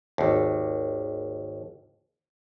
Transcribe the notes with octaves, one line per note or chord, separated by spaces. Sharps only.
G#1 D#2